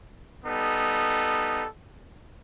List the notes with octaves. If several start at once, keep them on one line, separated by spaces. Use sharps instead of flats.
G3 B3 D#4 A4